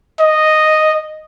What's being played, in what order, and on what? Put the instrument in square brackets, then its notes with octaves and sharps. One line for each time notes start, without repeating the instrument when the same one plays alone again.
[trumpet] D#5